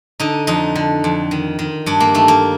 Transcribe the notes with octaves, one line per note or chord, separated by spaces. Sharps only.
D3 D#4
F2 D#4
D3
F2
D#3
D#3
G2 D4
A#3
D#3 A3
A#3